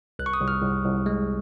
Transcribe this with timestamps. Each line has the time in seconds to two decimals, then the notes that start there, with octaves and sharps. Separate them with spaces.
0.19 C2 F#6
0.26 C#6
0.34 D#6
0.41 C2
0.48 F6
0.63 C2
0.84 C2
1.06 G#3